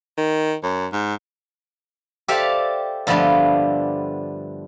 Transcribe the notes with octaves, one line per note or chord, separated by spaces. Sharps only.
D#3
F#2
G#2
G4 A4 C5 D5 E5 F5
G2 D3 F3 A3 B3 D4